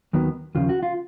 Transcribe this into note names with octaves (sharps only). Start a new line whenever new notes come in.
D#2 D#3 F#3 B3
D#2 C#3 F3 F4
F#4
F4